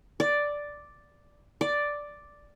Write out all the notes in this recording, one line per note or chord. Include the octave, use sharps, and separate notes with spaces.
D5
D5